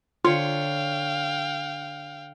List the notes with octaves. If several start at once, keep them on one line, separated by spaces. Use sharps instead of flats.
D3 F4 C#5 F5 G5